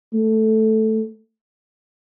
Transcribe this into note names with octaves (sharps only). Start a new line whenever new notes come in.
A3